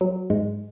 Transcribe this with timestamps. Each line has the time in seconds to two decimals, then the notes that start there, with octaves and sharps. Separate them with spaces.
0.01 F#3
0.30 G#2 G#3